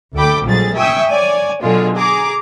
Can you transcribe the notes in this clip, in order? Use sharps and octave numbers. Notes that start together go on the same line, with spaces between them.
D2 A4 G5 B5 D6
A#1 F2 F#3 G3 G#4 A6
E5 G5 G#5 C#6 D#6 E6
C#5 D5 G#5
B2 D3 F#3 G#3 F4
G#4 A#5 D6